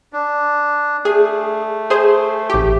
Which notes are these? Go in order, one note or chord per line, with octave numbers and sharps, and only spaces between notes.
D4
A3 G#4
G#4 C5
A1 G4